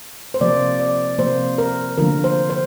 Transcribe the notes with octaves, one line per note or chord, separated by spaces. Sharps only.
C5
C3 F3 A#3 D5
D5
C3 F3 A#3 C5
A#4
D3 F3 A#3 A#4
C5
C5